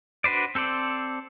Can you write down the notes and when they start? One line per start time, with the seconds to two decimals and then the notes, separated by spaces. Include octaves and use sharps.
0.24 D4 F#4 B4 C5 D5
0.55 C4 A4 C5 D5